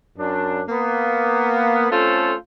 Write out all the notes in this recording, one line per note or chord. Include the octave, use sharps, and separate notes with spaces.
F#2 D4
A#3 B3
A3 C4 C#4 F4 A4 C5